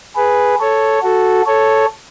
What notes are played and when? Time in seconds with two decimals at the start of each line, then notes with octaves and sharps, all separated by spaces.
0.16 G#4 B4
0.60 A4 C#5
1.03 F#4 A4
1.46 A4 C#5